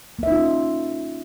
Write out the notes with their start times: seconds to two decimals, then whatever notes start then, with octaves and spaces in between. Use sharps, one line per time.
0.19 A#3
0.23 E5
0.27 D#4
0.32 F4
0.36 C#4